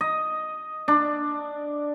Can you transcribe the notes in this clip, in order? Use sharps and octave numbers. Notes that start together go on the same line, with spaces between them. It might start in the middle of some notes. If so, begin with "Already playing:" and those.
D#5
D4